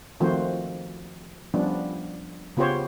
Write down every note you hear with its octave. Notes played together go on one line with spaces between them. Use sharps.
D#3 F3 A3 C4 F#4 C5
F3 G3 B3 C#4 D4
C#3 B3 F4 G4 C5 C#5